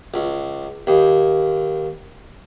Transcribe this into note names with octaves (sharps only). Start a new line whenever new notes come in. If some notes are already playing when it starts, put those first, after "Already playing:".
C#2
D#2